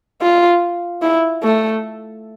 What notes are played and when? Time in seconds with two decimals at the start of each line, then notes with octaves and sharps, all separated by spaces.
0.21 F4
1.01 E4
1.43 A3